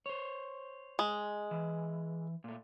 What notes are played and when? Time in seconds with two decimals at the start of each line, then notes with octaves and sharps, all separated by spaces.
0.06 C5 C#5
0.99 G#3
1.51 E3
2.44 A#2 A3